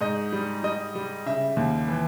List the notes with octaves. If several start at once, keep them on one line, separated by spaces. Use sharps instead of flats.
G#2 D#5
G3
G3 D#5
G3
C#3 E5
D#2
E3